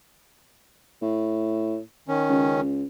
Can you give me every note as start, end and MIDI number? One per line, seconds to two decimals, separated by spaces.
1.01 1.79 45
2.08 2.61 51
2.08 2.61 61
2.30 2.84 37